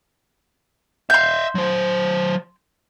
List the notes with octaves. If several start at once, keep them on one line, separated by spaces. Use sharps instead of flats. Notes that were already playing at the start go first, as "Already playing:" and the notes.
E5 F5 C6 G6
F#3 C5